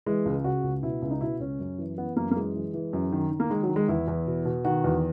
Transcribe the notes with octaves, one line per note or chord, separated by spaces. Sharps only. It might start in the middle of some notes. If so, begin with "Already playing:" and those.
E3 G#3
C#2
C#3 F#4
C#2
B2 E4
C#2
D#4
B2 E4
C#2 C#4
F#2
E3
E3 B3
F#2 A#3
A#3
E3 G#3
E3
E3
F#2
D#3
D#3
A#3
D#3 G#3
F#3
D#3
G#3
E2 E4
E2
B2
B2
D#3 F#4
E2